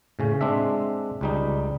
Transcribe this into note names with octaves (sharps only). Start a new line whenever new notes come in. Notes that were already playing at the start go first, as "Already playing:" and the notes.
A2 C#3 C#4
G#3 C4 D4 E5
C#2 G3 D#4